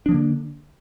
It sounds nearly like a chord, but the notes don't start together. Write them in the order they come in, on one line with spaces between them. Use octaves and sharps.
D4 F3 A#3 D3